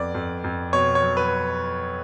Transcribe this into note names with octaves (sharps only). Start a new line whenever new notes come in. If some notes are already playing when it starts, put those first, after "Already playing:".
Already playing: F2 B3 D5
F2
F2
B2 C#5
C#5
F#3
B4